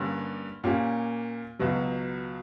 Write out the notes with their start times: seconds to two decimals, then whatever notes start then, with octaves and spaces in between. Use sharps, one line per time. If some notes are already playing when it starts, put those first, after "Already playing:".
Already playing: G2 D3 A#3 C#4 G4
0.64 A#2 A#3 C#4 G4
1.59 C#2 B2 F#3